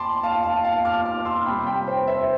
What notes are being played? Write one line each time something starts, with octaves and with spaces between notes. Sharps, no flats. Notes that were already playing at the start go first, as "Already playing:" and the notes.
Already playing: A5 B5 C6 D6
F5 A5
F5 A5
F5 A5
D6 F6
D6 F6
C6 E6
C3 G3 G5 B5
G5 B5
C5
C5 E5